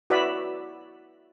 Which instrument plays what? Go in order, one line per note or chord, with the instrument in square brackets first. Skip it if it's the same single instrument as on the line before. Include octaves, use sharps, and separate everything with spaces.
[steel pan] E4 F#4 B4 D5 E5 B5